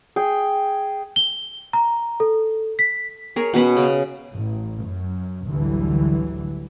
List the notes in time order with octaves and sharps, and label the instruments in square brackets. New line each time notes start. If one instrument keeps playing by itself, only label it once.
[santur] G#4 G5
[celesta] G7
A#5
A4
B6
[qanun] G#4 A#4 C#5
B2 C#4 B4 F#5
C#3
[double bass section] A1
F#2
A1 D2 D3 E3 F#3 G3